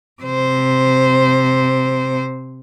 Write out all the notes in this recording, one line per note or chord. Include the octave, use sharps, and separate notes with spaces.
C3 C5